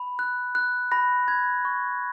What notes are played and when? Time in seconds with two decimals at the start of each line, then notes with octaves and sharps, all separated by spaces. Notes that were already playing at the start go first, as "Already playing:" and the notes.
Already playing: B5
0.19 F#6
0.55 F#6
0.92 B5 A#6
1.28 B5 G#6
1.65 C#6